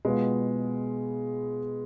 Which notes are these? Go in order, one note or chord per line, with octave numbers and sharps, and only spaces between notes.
B2 G#3 B3 F4 B4